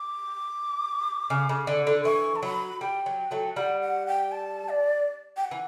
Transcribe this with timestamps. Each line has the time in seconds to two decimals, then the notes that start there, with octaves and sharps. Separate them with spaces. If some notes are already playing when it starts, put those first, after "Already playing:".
Already playing: D6
1.30 C#3
1.49 C#3
1.67 D3
1.87 D3
2.05 E3 C#6
2.36 A5
2.43 F#3 B5
2.81 G3 G5
3.06 F#3
3.31 F#3 A3
3.56 G3 F#5
3.81 F#5
4.07 G5
4.32 A5
4.69 D5
5.37 G5
5.45 F#5
5.51 E3